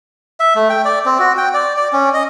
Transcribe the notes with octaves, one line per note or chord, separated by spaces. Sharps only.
E5
A3
G5
D5
C4
F#4
G5
D5
D5
C#4
D#5